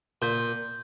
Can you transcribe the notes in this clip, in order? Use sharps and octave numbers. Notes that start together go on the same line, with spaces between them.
A#2 G6